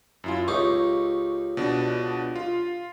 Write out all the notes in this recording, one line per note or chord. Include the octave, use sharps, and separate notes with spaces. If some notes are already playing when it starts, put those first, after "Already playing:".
F#2 E4 F4
C#2 D#4 G4 C#6
B2 D4
F4